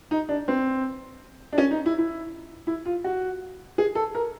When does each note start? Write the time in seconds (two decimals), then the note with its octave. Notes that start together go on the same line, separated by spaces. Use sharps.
0.11 D#4
0.29 D4
0.48 C4
1.53 D4
1.58 C#4
1.71 D#4
1.86 E4
1.98 E4
2.67 E4
2.86 F4
3.04 F#4
3.78 G#4
3.95 A4
4.15 A#4